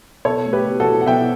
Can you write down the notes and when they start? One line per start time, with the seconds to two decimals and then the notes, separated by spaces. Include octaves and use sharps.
0.25 B2 A4 C#5
0.45 A3
0.53 G4 B4
0.67 B2
0.80 F#4 A4
0.86 B2
1.01 F#5
1.06 B2 E5 G5